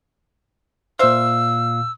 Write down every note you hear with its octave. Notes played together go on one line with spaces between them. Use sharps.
A#2 C5 E5 F5 E6